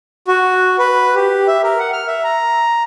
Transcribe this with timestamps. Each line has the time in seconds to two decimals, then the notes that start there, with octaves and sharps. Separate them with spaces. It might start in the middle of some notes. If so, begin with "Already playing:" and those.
0.28 F#4
0.79 B4
1.15 G4
1.48 E5
1.63 A#4
1.79 F#5
1.93 F6
2.07 E5
2.24 A#5